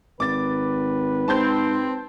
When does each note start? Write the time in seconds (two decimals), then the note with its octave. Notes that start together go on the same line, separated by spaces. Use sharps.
0.20 G#1 B4 D6 A6
1.28 G#2 C4 A5 C6 G6